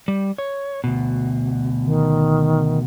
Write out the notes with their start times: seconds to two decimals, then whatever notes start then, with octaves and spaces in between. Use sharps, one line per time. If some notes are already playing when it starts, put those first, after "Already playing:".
0.08 G3
0.38 C#5
0.84 D2 B2
1.85 D#3